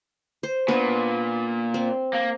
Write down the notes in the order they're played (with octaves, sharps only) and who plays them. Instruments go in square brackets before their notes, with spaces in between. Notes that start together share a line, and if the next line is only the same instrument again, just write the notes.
[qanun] C5
[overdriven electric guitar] A#2 [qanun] B3 D4
[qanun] C4
[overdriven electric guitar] A#3